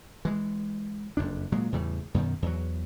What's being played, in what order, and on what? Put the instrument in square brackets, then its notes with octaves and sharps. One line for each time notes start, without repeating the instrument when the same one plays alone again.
[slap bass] E3 G#3
F#1 F2 D4
A#2 F#3 G#3
E2 A2 C#3 G3
F#2 B2 D#3
E2 F#3